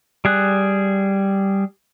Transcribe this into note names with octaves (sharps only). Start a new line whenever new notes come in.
G3 G#4 F#6